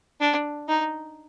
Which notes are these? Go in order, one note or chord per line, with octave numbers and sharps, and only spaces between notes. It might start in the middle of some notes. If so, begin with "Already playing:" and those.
D4
D#4